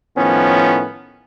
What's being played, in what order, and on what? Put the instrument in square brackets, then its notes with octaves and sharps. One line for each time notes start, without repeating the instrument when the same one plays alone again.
[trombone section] A2 D#3 F3 B3 C#4